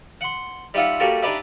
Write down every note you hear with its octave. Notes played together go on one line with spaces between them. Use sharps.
F#5 C6
G3 D#4 F4 E5 F#5
G3 A3 A#3 F#4
D4 D#4 G4 B4 D5 E5